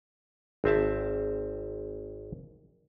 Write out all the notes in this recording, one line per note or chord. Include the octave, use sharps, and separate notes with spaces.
G#1 C4 E5 A5